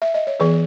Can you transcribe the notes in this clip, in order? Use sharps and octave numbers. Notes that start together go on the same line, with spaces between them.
E5
D#5
C#5
E3 B3 G#4 B4